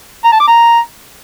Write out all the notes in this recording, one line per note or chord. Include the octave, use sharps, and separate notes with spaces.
A#5
A5
D6
A#5